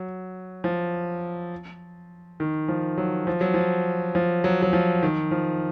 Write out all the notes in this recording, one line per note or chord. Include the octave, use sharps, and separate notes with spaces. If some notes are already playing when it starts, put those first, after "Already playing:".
Already playing: F#3
F3
D#3
F3
F#3
F3
F#3
F3
F3
F#3
F#3
F3
D#3
F3